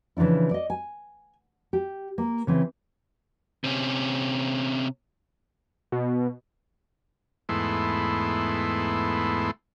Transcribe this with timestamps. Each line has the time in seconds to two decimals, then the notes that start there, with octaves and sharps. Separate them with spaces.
0.17 C#3 E3 F3 D4 E4
0.51 D5 D#5
0.70 G#5
1.73 G4
2.18 A#3
2.47 C#3 E3 C4
3.64 C3 C#4
5.92 B2
7.49 E2 G#2 A3 B3 E4 C6